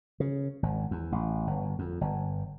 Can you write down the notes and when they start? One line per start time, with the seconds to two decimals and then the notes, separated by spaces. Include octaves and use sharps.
0.20 C#3
0.63 G#1
0.91 E2
1.12 A1
1.47 G1
1.79 F2
2.01 G1